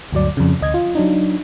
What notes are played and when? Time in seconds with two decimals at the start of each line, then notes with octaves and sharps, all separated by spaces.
0.13 D2 G2 F#3 D5
0.37 F2 C#3
0.61 D2 D#5 G#6
0.74 F4
0.95 F#3 D4 D#4